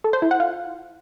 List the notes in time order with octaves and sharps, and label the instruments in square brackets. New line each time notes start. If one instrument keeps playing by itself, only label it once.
[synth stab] A4
C5
E4
F#5
F4